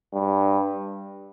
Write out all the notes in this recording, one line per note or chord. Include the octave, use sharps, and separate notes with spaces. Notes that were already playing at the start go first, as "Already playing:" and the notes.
G2